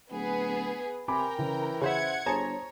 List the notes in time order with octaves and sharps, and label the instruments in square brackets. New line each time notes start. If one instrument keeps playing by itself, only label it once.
[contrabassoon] D1 [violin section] B3 G#4 B4
[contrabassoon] C3 [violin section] A#4 G5 A#5 [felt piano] G#5 B5 D6
[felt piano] C#3 [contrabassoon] E3
[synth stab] C#3 C5 E5 [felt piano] G#4 [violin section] F#5 G#6 C#7
[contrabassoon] G1 [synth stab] G#4 A5 A#5 [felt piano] C5 [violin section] C#5